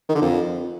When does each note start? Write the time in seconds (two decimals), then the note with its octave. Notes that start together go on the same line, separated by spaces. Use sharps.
0.09 D#3
0.15 D3
0.22 F2